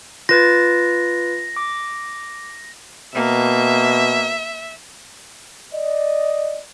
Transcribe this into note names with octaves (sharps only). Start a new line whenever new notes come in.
F4 B4 A6 A#6
D6
B2 A#3 E5
D5 D#5